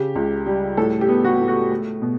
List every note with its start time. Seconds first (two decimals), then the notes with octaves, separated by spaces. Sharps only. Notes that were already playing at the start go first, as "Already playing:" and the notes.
Already playing: C#3 G4
0.15 C#2
0.47 G3
0.77 A2 A4
1.01 G4
1.08 B3
1.24 F#4
1.40 A2
1.48 F#4
1.71 A3
2.02 B2